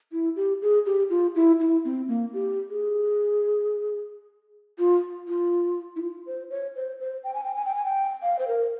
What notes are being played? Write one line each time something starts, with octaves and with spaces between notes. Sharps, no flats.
E4
G4
G#4
G4
F4
E4
E4
C4
A#3
G4
G#4
F4
F4
E4
F4
C5
C#5
C5
C5
G5
G#5
G5
G#5
G5
G#5
G5
F5
C5
A#4